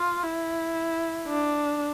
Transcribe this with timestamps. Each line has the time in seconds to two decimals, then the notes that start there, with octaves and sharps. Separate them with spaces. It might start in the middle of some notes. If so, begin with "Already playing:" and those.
Already playing: F4
0.22 E4
1.28 D4